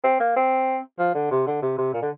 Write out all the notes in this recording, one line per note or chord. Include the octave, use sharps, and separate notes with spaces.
C4
A#3
C4
F3
D3
C3
D3
C3
C3
A#2
D3